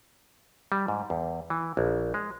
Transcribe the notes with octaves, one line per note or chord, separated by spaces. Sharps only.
G3
G#2
E2
E3
A#1
G#3